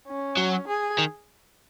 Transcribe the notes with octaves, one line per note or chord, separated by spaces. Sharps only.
C#4
F#3
G#4
D#3